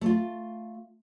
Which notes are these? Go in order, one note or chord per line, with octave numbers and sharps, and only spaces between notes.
A3 F4